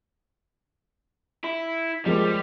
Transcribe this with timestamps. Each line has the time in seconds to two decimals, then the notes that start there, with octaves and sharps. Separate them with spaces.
1.44 E4
2.06 F3 G3 G#3 A#4